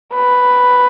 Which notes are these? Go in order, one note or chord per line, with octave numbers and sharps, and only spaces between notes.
B4